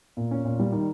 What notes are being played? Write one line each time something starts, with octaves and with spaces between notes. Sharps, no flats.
A#2
C#4
A#2
G3
D#3